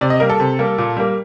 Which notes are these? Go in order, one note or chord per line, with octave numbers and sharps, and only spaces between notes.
C3 D5
D#5
G3 A#3 A#4
A4
C3
G3 A#3
A#2
G3 A#3